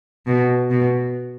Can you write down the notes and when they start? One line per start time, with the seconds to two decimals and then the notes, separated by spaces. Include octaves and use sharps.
0.27 B2
0.71 B2